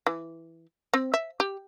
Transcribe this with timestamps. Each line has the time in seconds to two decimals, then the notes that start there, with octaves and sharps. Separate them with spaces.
0.07 E3
0.94 C4
1.14 E5
1.40 G4